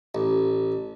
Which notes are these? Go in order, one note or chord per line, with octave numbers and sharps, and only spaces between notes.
A1